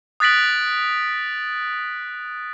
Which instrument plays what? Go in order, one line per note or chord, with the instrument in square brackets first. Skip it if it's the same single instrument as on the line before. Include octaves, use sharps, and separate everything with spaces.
[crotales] D#6 F#6 A6 B6 D7 F#7